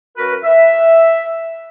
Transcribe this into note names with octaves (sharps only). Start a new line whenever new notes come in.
F#2 F#4 A#4 B4
E5